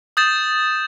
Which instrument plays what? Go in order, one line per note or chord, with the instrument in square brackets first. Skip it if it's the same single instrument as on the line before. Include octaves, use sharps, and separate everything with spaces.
[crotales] D#6 G6 A6 E7